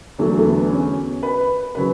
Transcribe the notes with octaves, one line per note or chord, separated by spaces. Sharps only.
E2 D3 F#3 A3
A3
B3
C#4
B4
C#3 F#3 B4